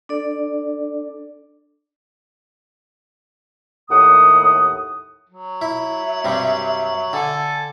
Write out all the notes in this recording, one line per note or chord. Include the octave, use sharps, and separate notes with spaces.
D4 A4 D5
D#2 A2 F#5 D#6
F#3
E4 E5
G2 C3 G3
D3 A4 G#5